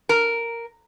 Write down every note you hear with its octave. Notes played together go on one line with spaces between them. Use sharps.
A#4